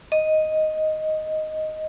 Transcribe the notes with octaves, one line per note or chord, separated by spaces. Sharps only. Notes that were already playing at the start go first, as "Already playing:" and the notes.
D#5